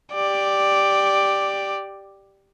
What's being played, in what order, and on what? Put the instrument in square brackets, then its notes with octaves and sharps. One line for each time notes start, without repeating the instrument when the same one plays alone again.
[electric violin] G4 D5